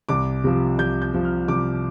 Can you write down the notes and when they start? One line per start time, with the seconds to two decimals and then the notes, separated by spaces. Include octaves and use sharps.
0.09 C2 D6
0.44 C3 F3
0.78 C2 G6
1.02 G6
1.14 C3 F3
1.25 F6
1.48 C2 D6